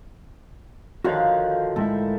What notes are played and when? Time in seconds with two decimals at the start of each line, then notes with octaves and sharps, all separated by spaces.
1.04 D3 D#3 F3 F#4 C#5 F5
1.76 A2 G#3 E4 A4